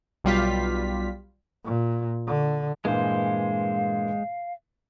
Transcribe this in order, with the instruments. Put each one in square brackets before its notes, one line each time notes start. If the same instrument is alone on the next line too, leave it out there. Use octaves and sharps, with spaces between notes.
[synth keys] B1 G3 F4 B6
[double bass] A#2
D3
[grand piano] G2 A#2 E3 [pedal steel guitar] G#3 C5 [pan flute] F5